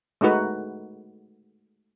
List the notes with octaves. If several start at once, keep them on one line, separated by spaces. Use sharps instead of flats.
G#3 A3 D#4 F#4 B4